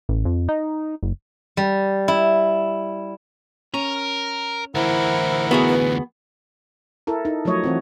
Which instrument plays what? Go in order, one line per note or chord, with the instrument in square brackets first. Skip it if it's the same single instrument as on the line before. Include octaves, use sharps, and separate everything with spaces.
[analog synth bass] A1
F2
D#4
F#1
[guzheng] G3
E4
[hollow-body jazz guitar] C#4 [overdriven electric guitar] A#4
[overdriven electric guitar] D2 E3 [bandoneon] E4 A#4 F#5 [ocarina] C5
[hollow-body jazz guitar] B3 F#4 G#4
[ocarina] B4
[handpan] E4 A4 A#4
D#4
F3 F#3 A3 C#5 D#5
E3 C4 F#4